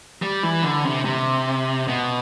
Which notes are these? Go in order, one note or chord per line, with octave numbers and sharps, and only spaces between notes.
G3
E3
D3
C3
C3
B2